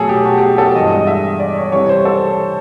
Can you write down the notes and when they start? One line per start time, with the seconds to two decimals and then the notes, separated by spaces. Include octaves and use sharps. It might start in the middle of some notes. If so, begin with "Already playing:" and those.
Already playing: B2 F#3 A3 G#4 A4
0.09 G4
0.25 F#4
0.38 G4
0.42 G#4
0.58 A4
0.75 G2 E3 G#3 D#5
0.91 D#5
1.07 E5
1.40 D5
1.57 C#5
1.72 C3 E3 G3 C#5
1.89 C5
2.05 A4